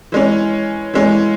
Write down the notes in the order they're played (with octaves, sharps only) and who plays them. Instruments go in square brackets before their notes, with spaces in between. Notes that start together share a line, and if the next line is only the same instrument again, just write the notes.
[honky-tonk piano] E3 G#3 C#4
E3 G#3 C#4